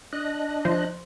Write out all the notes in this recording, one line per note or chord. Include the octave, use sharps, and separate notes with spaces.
D4 D#5 F#6
F3 C5